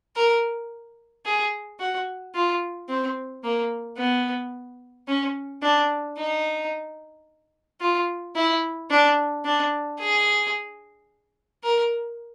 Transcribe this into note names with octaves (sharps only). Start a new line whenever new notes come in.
A#4
G#4
F#4
F4
C4
A#3
B3
C#4
D4
D#4
F4
E4
D4
D4
G#4
A#4